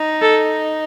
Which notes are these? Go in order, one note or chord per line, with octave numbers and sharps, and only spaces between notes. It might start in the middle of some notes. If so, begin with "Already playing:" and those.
Already playing: D#4
A4